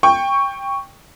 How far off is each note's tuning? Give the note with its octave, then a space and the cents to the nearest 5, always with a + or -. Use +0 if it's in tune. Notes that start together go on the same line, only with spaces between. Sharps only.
G5 +15 C#6 +0